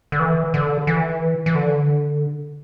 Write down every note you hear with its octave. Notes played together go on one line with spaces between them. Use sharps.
D3
E3
D3
E3
E3
D3